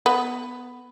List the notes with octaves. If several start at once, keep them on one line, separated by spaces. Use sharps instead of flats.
B3